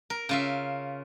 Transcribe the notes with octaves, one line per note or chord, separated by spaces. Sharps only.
A#4
C#3 F4 E5